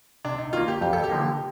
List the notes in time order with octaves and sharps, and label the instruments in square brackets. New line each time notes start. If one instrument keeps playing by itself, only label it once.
[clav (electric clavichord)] C3 [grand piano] D4
[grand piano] D#4
[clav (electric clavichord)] D#3 A#3 [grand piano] F4
[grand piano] G4
[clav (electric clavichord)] F2 [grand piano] G4
[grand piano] A4
G4
[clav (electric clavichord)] D3 F3 A#3 D#4